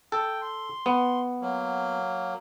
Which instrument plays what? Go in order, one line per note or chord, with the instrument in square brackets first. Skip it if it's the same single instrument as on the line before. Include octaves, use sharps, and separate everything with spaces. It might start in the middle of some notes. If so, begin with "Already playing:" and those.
[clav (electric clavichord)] A4 [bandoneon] G5
[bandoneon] C6
[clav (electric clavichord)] B3
[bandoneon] F#3 A#3